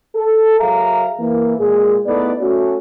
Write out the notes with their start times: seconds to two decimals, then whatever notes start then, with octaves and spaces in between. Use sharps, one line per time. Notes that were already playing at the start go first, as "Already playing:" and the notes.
0.16 A4
0.60 F#3 G#4 A#4 E5 F5 A#5
1.20 E3 A#3
1.59 A#2 G#3 G#4
2.06 A3 B3 D#4 E4 A4 D5
2.41 A3 C#4 F#4